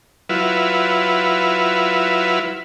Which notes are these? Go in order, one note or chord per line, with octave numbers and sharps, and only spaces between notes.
F#3 E4 F4 B4